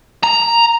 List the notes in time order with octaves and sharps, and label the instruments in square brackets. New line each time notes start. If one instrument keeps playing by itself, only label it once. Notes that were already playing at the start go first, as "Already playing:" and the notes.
[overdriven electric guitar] A#5